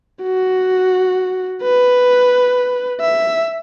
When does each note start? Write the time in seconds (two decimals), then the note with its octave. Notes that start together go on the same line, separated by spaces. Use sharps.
0.23 F#4
1.62 B4
3.01 E5